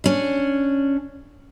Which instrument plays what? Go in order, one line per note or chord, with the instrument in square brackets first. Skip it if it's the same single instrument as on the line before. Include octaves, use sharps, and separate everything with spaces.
[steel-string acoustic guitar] C#4 D4